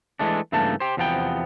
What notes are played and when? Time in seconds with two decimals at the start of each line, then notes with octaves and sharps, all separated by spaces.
0.19 E3 G#3 A3 D4
0.52 G2 C#3 E3 A3 A#3 A5
0.80 G4 C5
0.97 E2 C3 F3 B3 D4 G5